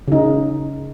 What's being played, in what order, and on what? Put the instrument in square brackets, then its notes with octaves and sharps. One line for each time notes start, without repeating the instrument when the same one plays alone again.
[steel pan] C#3 D#4